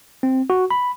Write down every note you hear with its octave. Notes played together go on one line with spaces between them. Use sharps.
C4
F#4
B5